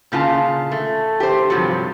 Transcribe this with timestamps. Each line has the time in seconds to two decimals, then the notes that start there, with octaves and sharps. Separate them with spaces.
0.12 A#2 C#3 F4 A5
0.71 A3
1.20 G4 C5
1.50 G2 C3 F3 F#3